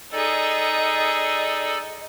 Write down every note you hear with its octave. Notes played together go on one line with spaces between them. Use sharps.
D#4 G#4 A4 D5 D#5